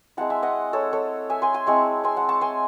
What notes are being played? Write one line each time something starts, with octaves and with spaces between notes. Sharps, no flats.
G#3 C4 E4 F#5 A5
E5 G#5
D#5 F#5
A4 C#5
A4 C#5
E5 G#5
G#5 C6
G#5 C6
G#3 C4 E4 A5 C#6
G#5 C6
F#5 A5
A5 C#6
G#5 C6